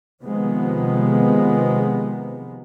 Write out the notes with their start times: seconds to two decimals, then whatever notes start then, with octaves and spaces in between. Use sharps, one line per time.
0.22 C3 D#3 F3 G#3 B3